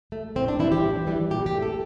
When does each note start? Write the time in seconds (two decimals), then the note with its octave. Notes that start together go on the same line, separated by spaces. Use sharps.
0.12 A3
0.36 A2 C4
0.48 D4
0.59 E3 E4
0.64 G3
0.72 G4
0.83 A2
1.07 E3 G3
1.30 A#2 G4
1.46 G4
1.55 A3
1.62 A4